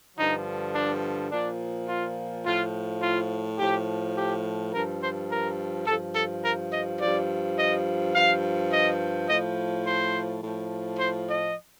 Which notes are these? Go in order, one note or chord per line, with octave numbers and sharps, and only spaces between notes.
G2 D3 F3 D#4
D4
A#2 F3 D4
F4
A2 F3 F4
F4
A2 F3 G4
G4
G2 F3 A#4
C5
A#4
G2 F3 A4
A4
A#4
D#5
G2 F3 D5
D#5
G2 F3 F5
D#5
A2 F3 D#5
C5
A2 F3
C5
D#5